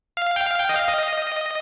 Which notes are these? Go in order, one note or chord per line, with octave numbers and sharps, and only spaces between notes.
F5
G5
F5
G5
D#5
F5
D#5